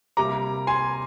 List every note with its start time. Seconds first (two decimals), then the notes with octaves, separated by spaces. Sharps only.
0.17 C3 G3 A#3 A#5 D6
0.67 G#5 C6